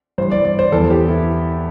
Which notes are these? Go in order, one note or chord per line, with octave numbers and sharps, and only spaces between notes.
G2 E3 C5
D5
D5
C5
E2 E3 A4
G4
E4